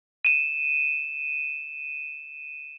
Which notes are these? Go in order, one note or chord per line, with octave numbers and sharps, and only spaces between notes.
D#7 E7